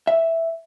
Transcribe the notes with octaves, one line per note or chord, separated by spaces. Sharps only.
E5